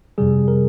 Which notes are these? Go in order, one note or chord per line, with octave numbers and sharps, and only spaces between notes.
F2 C3 G3 G#4
A#4